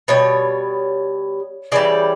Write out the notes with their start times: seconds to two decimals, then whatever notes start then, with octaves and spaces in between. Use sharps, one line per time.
0.08 B2 G3 C#5
1.72 C#3 E3 G3 D5